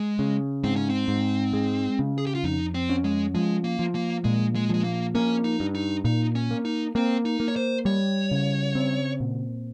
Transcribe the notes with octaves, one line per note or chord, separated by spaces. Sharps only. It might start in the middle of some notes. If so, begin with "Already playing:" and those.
Already playing: G#3
C#3
G#2 C4
C#4
C4
G#2
G#3
C#3
G#4
G4
F4
F2 D#4
C4
C#4
G#3
F3 G#3
A#3
F3
A#3
A#2 G#3
G#3
F3 G#3
A#3
A#3 C#4
D#4
G2
D#4
A#2 D#4
C#4
A#3
D#4
A#3 C4
D#4
A#3
C#5
C5
G3 C#5
C#3
C4
A#2